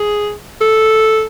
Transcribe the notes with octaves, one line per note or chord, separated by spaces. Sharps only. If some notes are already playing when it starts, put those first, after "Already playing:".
Already playing: G#4
A4